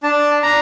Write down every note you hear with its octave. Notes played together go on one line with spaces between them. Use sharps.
D4 A5
D4 A#5